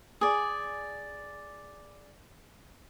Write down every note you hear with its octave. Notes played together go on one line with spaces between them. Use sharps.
G#4 D5